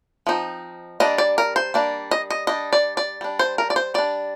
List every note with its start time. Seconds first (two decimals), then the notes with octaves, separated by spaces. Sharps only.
0.27 F3 C4 D#4
1.00 G3 A#3 D4 D#5
1.18 D5
1.38 A#4
1.56 C5
1.74 G3 A#3 D4
2.11 D#5
2.30 D#5
2.47 G3 D4 D#5
2.73 D5
2.97 D5
3.21 G3 D4
3.39 C5
3.58 A#4
3.70 D5
3.76 C5
3.94 G3 D4 D5